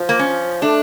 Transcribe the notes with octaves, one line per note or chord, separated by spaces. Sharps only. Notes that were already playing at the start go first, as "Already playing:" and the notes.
Already playing: F3
A#3
C#4
A3 D4